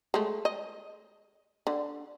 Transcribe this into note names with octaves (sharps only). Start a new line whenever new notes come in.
G#3 A3
D#5
D3